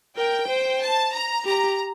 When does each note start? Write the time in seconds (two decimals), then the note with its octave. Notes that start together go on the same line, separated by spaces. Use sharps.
0.16 A#4 G5
0.48 C5
0.81 A5
1.13 A#5
1.45 G4 A#5